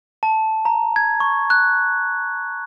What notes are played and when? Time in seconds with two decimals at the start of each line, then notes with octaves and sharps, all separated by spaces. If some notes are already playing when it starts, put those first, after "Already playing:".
0.23 A5
0.65 A#5
0.96 G#6
1.20 C#6
1.50 F#6